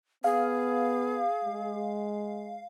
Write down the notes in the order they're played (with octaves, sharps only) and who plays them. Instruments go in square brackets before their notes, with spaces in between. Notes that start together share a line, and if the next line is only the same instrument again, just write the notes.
[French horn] B3 [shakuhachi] G#4 [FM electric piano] F5
[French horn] G#3